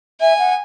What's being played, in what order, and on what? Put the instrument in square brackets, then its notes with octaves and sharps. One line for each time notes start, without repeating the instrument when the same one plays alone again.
[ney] E5 [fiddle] G#5
[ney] F#5